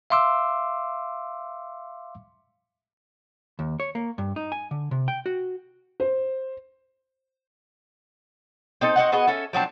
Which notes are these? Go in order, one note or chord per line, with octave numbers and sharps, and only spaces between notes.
E5 F5 C6 D6 E6
D#2
C#5
A#3
G2
D#4
G#5
D3
C3
G5
F#4
C5
C4 D#4 A4
C4 F#4 D#5 F#5
B3 F#4 G#4 D#5
C#4 A4 E5
F3 F#3 C4 D4